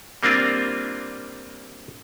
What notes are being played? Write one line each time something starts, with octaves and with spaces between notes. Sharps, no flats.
G3 A#3 C4 D4 F4